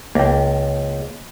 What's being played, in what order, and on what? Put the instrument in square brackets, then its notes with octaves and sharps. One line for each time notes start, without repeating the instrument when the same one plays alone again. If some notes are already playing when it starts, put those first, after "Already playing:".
[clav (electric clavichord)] C#2 [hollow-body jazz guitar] A#3 G5